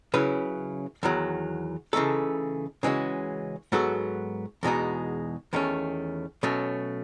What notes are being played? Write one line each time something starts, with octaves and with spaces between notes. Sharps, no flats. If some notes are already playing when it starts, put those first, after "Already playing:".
C#3 F#3 C#4 E4 B4
E2 D#3 F#3
C#3 E3 A3 D#4 A4
C#3 E3 G#3 C#4 F#4
G#2 F#3 B3 F#4 A4
E2 B2 G#3 D#4 F#4
E2 D#3 A3 C#4
B2 F#3 A3 C#4